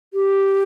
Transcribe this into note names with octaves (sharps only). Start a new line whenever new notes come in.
G4